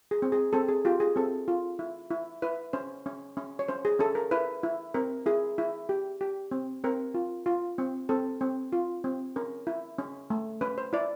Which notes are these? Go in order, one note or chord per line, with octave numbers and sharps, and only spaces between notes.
G#4
C4
G#4
C4 A4
G#4
F4 G4
G#4
C4 A4
F4
E4
E4
E4 B4
C#4 C5
C#4
C#4
C#5
C#4 C5
G#4
C#4 A4
A#4
E4 B4
E4
C4 A#4
E4 G#4
E4
G4
G4
C4
C4 A#4
F4
F4
C4
C4 A4
C4
F4
C4
C#4 A#4
E4
C#4
A3
C#4 B4
C5
E4 D5